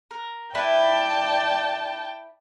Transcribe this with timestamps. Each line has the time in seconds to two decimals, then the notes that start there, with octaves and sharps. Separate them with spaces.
0.11 A#4
0.55 E4 B4 D5 G5 A5